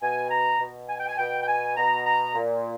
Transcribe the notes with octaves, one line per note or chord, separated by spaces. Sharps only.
B2 G#5
A#5
B2
G#5
G5
G#5
B2 G5
G5
G#5
B2 A#5
A#5
A#2